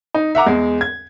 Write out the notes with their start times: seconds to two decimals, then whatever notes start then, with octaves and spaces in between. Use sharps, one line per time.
0.14 D#4
0.35 E5 F#5 A#5 D6
0.46 E2 G#3
0.81 G#6